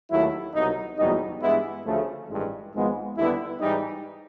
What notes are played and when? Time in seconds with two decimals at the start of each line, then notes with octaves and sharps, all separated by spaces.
0.10 D#2 D#3 F#3 A3 E4
0.54 C2 B2 F#3 D#4
0.97 F#1 E2 B2 G3 D#4
1.41 G2 E3 G#3 B3 E4
1.85 D2 C#3 F3 A3
2.29 A1 G2 D#3 G#3
2.72 G#1 G#2 F3 G#3 B3
3.16 D#2 D3 G3 B3 E4
3.60 G#2 E3 G3 D#4